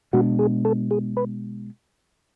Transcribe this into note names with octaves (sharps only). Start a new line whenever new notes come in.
B2 G#3 B3 D4 F#4
G#4
A4
G#4
B4